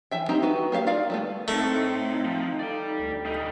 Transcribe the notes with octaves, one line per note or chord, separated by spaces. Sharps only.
E3 E5 G5
C4 D#4 G4 G5 A#5
B3 F#4 B4
A#3 G4 D#5 F5
F4 A#4 D5 F5
G3 A3 B3
A2 A3 C4 D#4
F3
A4 D5 G5
D2
G3 D#4 A4